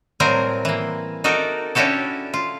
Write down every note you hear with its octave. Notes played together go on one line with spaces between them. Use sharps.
A2 F#3 G3 C4 A#4 G#5
E3 A#3
D#4 F#4 A4 A#4 D5
C#4 D4 E4 F#4 G4 A4
F4